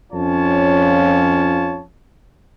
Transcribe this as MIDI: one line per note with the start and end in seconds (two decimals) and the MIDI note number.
0.12 1.83 41
0.12 1.83 61
0.12 1.83 65
0.12 1.83 73
0.12 1.83 81